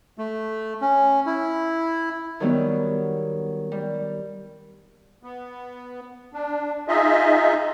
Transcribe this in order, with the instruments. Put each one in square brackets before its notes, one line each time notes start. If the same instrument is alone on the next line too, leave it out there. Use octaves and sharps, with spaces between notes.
[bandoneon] A3
C#4
E4
[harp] D#3 F#3 G3 B3
G3
[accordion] B3
D4
D#4 F4 G#4 D#5 E5